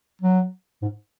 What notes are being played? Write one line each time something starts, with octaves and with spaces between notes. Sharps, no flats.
F#3
G#2